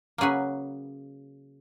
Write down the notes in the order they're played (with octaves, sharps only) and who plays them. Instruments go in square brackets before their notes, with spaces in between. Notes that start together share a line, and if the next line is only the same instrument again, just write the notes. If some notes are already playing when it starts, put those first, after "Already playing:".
[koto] C#3 F#3 A#3 G#4 B4